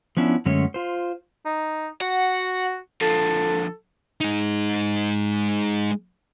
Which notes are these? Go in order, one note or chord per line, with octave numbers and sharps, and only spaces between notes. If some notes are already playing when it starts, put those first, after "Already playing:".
F3 B3 C#4 D4 E4
F#2 D3 G#3 A3 C#4 C#5
F4 C5
D#4
F#4 F#5
D3 F3 A4
G#3 D#4